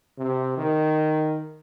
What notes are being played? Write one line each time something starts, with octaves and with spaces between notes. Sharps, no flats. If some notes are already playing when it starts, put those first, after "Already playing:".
C3
D#3